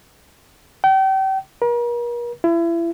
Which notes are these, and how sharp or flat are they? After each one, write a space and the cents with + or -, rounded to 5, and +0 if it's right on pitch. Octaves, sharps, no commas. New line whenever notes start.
G5 -35
A#4 +40
E4 +35